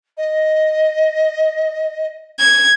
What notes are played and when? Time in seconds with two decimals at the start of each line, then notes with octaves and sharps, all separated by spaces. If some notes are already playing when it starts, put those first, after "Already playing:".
0.17 D#5
2.39 G#6